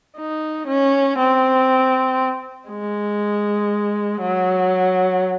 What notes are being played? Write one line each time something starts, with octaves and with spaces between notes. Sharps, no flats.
D#4
C#4
C4
G#3
F#3